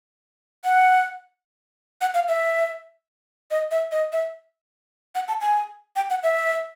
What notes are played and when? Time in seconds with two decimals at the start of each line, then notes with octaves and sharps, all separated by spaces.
0.64 F#5
2.01 F#5
2.14 F5
2.28 E5
3.51 D#5
3.71 E5
3.92 D#5
4.12 E5
5.15 F#5
5.28 A5
5.41 G#5
5.96 G5
6.10 F#5
6.23 E5